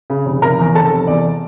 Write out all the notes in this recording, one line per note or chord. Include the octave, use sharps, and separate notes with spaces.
C#3
F1
F1 A#4 A#5
E2
F1 A4 A5
F1
E2 D5